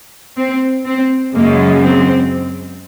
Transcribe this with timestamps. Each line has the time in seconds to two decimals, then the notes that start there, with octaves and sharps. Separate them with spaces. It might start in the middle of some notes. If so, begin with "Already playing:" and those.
0.38 C4
0.86 C4
1.34 F#2 C#3 G#3 A#3
1.82 C4